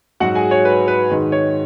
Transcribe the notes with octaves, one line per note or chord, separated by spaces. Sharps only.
G#2 F#3 F#4 F#5
G#4 G#5
C#5
B4
B4
G#2 D#3 G#3
C#5